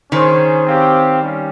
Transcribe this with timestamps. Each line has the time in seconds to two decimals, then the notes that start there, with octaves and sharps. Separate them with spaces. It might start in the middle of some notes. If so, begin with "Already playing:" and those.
0.12 D#3 C#4 G#4 C5
0.66 C4 G4 C#5 F5
1.21 G3 C#4